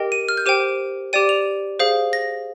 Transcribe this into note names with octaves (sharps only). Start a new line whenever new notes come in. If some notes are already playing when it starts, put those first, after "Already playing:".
Already playing: G4 A#4 D#5 G5
D#7
F6
G6
G4 C5 G5 D#7
G4 D5 G5 D#7
F7
G#4 C5 F5
A#6